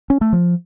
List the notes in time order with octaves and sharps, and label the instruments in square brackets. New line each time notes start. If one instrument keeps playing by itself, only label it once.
[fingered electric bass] C#4
A3
F3